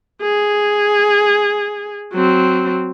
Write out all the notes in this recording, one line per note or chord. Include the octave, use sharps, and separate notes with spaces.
G#4
F#3 C4